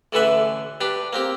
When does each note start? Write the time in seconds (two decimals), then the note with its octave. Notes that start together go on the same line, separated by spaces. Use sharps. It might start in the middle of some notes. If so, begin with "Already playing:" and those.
0.13 A1 D3 E3 A4 B4 E5
0.81 D4 G4 B4
1.13 A#3 C4 G4